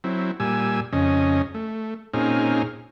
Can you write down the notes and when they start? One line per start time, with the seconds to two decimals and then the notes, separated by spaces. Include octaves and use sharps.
0.04 F#3 C4 E4
0.40 A#2 G3 G#5 E6
0.93 F2 C#3 C#4 D#5
1.54 A3
2.14 A#2 C4 C#4 D#4 G#4 F6